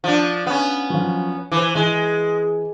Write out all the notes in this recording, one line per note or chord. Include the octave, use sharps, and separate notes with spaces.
F3 D4
B3 C#4
F3 F#3
E3 C5 D6
E3 G#3